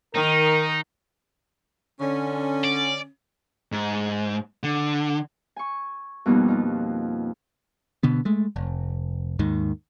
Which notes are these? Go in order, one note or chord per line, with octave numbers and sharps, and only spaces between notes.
D#3 D#4 A#4
D3 C#4
D5
G#2
D3
G#5 C#6
F2 B2 G3 A#3 B3 D#4
D#4 F4
B2 D3 B3
G#3 A3
F1
D#2 G#2 D#3